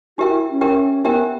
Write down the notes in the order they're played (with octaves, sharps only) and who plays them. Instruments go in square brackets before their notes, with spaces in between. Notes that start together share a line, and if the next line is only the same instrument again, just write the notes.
[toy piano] D4 G4 A#4 E5 G5 [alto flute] F#4
[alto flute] E4
C#4
[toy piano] D4 G4 A#4 E5 G5
[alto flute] B3 [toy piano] D4 G4 A#4 E5 G5